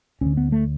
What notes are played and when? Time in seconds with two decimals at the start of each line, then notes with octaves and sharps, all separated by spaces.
0.21 D2 D3 C#4
0.37 B3
0.52 A3